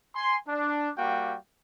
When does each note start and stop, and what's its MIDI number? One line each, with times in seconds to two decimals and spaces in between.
0.16 0.37 80
0.16 0.37 84
0.48 0.90 62
0.97 1.37 55
0.97 1.37 58
0.97 1.37 66
0.97 1.37 77
0.97 1.37 79